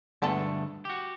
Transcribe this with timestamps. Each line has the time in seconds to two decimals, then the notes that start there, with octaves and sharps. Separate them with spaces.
0.22 D2 G2 G#3 A3 B3 A4
0.85 F#4 G4